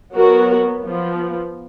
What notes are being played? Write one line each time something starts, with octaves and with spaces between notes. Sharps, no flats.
F#3 B3 F#4 A#4
F3 B3